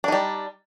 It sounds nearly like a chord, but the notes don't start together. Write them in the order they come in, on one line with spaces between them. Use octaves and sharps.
D4 D#4 G3